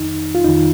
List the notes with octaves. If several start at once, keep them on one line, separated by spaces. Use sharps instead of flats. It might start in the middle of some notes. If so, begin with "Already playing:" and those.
Already playing: F2 D#3 D#4
F4
F2 D#3 D#4